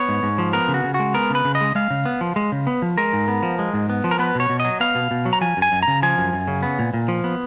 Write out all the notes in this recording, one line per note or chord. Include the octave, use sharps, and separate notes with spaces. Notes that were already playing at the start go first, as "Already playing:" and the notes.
Already playing: B3 C#5
G#2
G#2
F3
B3 A#4
C#3
F#4
C#3
F#4
G#3
B3 A#4
C#3 B4
C#3
D#5
G#3
G#3 F5
C#3
B3
F3
G#3
C#3
B3
F3
G#3 A#4
G#2
B3
F3
G#3
G#2
B3
F3
A#4
B3 B4
B2 C#5
B2
D#5
F#3
B3 F5
B2
B2
F#3
A#5
F3 G#5
F#2
G#5
F#2
A#5
C#3
F3 G#5
F#2
F#2
C#3
B3
A#2
A#2
F3
B3